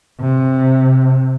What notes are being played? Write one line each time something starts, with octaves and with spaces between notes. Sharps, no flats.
C3